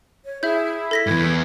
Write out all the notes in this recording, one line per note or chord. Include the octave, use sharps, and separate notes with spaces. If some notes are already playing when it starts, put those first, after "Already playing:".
C#5
E4 G#4 E5 G6
A4 A#6 B6
E2 G2 G#6